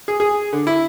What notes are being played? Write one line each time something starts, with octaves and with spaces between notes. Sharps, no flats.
G#4
G#4
D3
E4